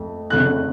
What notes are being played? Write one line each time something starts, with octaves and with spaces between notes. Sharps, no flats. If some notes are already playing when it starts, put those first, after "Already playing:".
Already playing: F2 A3
F2 C#3 A3 C#4 F#6